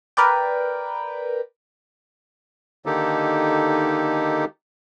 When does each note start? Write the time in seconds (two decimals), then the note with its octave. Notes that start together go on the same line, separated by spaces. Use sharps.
0.17 A#4 B4 D5 G5
2.86 D3 D#3 A#3 D#4 G4 A4